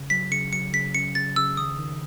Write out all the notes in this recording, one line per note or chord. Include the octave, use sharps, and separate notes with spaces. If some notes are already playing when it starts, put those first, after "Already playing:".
Already playing: C#3
F#3 B6
C#3 C#7
F#3 C#7
C#3 B6
C#4 C#7
C#3 A6
C#3 E6
D#3 D#6
D#3